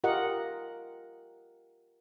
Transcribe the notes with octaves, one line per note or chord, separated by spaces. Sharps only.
F4 G4 A#4 D#5 F#5